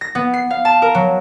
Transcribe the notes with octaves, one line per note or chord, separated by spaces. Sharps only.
A#6
B3
C7
F5
A5
A#4
F#3